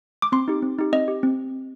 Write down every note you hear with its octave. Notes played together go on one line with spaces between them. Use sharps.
D6
C4 C6
D#4 G4
C4
D#4 G4
C4 D#5
G4
C4